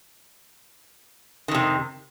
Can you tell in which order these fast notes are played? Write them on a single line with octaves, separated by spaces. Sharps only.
D#3 F2 C3